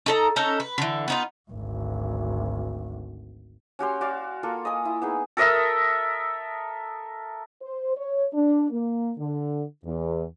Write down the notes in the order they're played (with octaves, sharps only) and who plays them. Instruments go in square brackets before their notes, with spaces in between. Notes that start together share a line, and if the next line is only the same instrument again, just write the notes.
[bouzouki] D#4 A4 A#5
C#4 D#4 A4 A#5
B4
D3 E3
B3 D#4 F4
[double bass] G#1 D2
[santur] C#4 F#4 G4 C6
F#4 D5 F5 D6
A#3 F4 A4
D#5 G#5 D#6
E4
B3 D#4 G#4
[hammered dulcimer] A4 A#4 D#5 E5
[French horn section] C5
C#5
D4
A#3
D3
E2